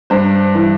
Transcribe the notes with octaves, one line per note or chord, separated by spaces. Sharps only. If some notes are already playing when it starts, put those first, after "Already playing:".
G2 C5
E3